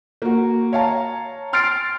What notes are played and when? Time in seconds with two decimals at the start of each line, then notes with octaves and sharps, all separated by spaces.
0.22 A#3 F#4
0.73 C#5 F5 A5 A#5
1.53 C6 F6 A6 C7 D7